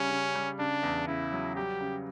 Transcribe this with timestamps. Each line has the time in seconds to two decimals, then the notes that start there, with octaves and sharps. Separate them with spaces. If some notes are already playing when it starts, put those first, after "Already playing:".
Already playing: C#3 G3 C#4
0.11 C#3
0.35 G3
0.58 C#3 D4
0.83 E2
1.07 C#3 E4
1.32 F#3
1.56 G3 G4
1.80 C#3